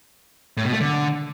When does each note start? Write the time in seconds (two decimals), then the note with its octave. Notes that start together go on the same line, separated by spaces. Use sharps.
0.57 A2
0.65 B2
0.73 A3
0.80 D3